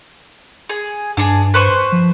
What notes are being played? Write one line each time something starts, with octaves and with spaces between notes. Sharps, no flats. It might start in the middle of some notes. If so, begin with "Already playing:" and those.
G#4
G2 D4 G#4
B4 C5 C#6
F3